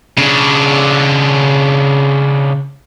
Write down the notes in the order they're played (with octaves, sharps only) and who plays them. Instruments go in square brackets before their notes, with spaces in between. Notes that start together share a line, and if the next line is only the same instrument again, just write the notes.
[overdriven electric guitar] C#3 D4